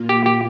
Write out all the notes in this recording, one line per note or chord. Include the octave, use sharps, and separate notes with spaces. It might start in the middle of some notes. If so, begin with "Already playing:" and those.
Already playing: A#2 A#3 F4
G4
G4